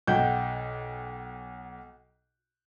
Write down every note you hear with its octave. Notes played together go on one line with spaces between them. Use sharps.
B1 F#5 G5 G6